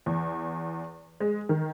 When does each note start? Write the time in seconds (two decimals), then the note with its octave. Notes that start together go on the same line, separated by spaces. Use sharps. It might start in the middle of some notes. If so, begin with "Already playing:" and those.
0.06 E2
1.20 G#3
1.49 D#3